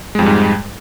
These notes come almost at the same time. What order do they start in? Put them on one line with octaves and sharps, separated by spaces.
G#3 F2 G3 G#2